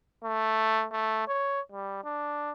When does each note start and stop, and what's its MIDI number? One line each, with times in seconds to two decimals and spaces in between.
0.24 0.85 57
0.92 1.25 57
1.28 1.61 73
1.72 2.03 55
2.04 2.51 62